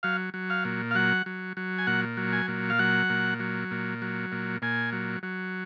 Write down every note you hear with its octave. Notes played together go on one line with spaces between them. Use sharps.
F#3 F5
F#3
F5
A#2
F5
F#3 F#5
F#3
F#3
G#5
A#2 F#5
F#3
G#5
A#2
F5
F#3 F#5
A#2
F#3
A#2
F#3
A#2
A#2 G#5
F#3
F#3